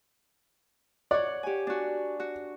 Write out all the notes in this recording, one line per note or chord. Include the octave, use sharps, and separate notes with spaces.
C#5 D5 F#5
G4 G#5
D4 F#4
F#4